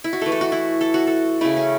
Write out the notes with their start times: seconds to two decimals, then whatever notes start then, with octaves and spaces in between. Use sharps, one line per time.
0.04 E4
0.13 F#4
0.21 E3 A3 A4
0.32 A4
0.41 F#4
0.52 E4
0.81 A4
0.94 F#4
1.07 A4
1.41 C#3 A3 E4
1.56 C#4